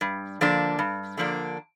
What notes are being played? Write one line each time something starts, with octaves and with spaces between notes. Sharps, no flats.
G2
D3 F3 A#3 D4
G2
D3 F3 A#3 D4